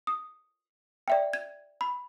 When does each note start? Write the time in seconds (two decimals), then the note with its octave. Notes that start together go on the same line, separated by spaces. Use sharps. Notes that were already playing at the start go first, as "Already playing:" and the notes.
0.07 D#6
1.08 D5 E5 G5
1.33 G#6
1.81 B5